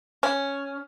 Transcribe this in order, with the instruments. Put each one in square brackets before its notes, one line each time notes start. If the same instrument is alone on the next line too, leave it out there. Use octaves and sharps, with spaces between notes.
[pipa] C#4